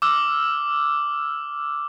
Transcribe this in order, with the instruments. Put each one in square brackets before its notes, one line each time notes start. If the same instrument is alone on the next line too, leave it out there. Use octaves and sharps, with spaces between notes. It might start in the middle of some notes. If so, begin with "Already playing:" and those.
[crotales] D6 E6 F6